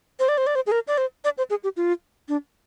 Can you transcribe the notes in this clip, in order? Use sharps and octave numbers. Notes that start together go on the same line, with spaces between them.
C5
D5
C5
D5
C5
G#4
A#4
D5
C5
D5
C5
G#4
G4
F4
D4